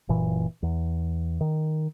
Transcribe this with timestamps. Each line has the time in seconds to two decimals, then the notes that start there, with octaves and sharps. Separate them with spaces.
0.09 F#1 A#2 E3
0.63 E2
1.41 D#3